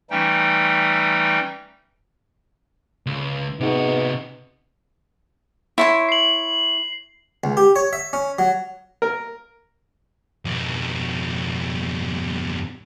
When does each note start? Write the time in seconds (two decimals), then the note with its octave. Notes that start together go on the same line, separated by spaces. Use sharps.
0.11 E3 G3 A3 C#4 D#4 G5
3.06 C#2
3.60 C3 B3 D#4 F#4 G#4
5.78 E4 C#5 C6
6.09 C7 F#7
7.44 C#2
7.57 G4
7.76 C#5
7.93 E5
8.13 C#4
8.39 F#3
9.02 A#4
10.45 F2 B2